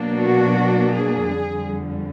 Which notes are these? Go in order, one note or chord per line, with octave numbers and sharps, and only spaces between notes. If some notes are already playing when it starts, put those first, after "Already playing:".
Already playing: B2 F#3 A#3 D4
F#4
G#4
F2 D3 G3